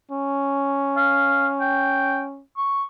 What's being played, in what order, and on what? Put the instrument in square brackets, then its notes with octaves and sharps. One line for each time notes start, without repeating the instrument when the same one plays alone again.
[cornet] C#4
[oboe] F5
G5
C#6